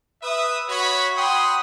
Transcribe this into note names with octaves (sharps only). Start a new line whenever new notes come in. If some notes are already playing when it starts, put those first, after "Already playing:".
B4 E5 D#6
F#4 C#5 B5
C#5 F#5 G5 B5 C6 D#6